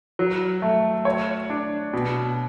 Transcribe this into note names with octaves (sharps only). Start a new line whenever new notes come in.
F#3
A3
C#5
D4
B2